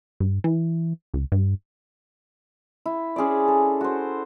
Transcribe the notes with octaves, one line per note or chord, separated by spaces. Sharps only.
G2
E3
C#2
G2
E4
C#4 G#4 C5 D5
A4
F#4 C5